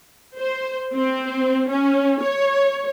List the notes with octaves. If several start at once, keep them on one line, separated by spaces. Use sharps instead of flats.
C5
C4
C#4
C#5